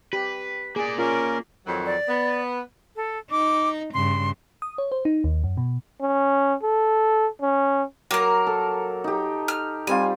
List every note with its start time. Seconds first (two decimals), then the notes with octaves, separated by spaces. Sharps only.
0.13 G4 B4
0.76 A#3 G#4 D5
0.98 C#4 F4 A#4
1.66 F2 D#3 F#3
1.86 D5
2.08 B3
2.96 A4
3.31 D#4 D6
3.94 G2 C#3 C6
4.62 D#6
4.78 C#5
4.92 C5
5.05 D#4
5.24 D#2
5.44 F#2
5.57 B2
6.01 C#4
6.63 A4
7.42 C#4
8.11 F#3 A#3 A#4
8.47 A4
9.04 D#4 G4
9.48 F6
9.87 G3 C4 F4 G#5